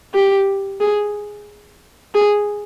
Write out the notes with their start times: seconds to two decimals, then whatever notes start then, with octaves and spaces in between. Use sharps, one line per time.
0.14 G4
0.80 G#4
2.15 G#4